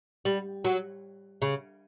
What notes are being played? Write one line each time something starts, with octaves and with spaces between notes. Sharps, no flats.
G3
F#3
C#3